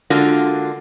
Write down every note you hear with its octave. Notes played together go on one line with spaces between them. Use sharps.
D3 G#3 A#3 D4 F4 F#4